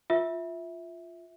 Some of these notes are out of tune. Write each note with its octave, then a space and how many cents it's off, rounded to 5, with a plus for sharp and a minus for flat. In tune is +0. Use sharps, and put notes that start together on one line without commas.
F4 +0 E5 -5